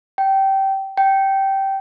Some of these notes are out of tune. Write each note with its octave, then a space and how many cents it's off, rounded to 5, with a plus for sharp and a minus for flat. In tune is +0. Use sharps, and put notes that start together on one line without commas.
G5 -20
G5 -15